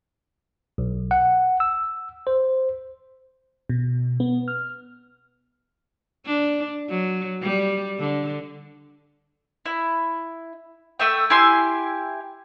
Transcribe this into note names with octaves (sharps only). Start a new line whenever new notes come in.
B1
F#5
E6
C5
B2
B3
F6
D4
F#3
G3
D3
E4
A3 E5 G5
E4 G4 G#5 C6